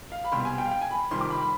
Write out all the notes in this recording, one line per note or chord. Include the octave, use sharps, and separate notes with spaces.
F5
B5
C2 B2 G3 C6
G#5
G5
F5
G5
G#5
B5
F2 C3 D#3 G3 C6
D6
B5
B5